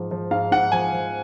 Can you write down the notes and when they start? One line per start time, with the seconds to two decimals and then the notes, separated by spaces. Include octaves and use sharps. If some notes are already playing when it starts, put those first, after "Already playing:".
Already playing: G#2 F3
0.11 F3
0.31 G#2 F5
0.52 G#2 F#5
0.72 F3 G#5
0.93 F3